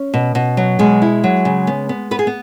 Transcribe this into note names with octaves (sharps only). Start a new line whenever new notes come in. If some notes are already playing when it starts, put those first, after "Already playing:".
Already playing: C#4 C#5
B2
B2
F#3
B2 G#3 G#4
E4
F#3
C#3
B3
B3
B3 B4
G#4
B3